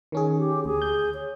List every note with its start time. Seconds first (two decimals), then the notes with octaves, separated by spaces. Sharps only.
0.12 D#3 C#4 G#4
0.38 G4
0.65 D2 G#4
0.82 G6
1.14 C#5